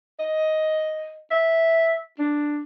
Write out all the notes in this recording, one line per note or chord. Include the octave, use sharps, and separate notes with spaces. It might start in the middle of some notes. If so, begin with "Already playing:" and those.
D#5
E5
D4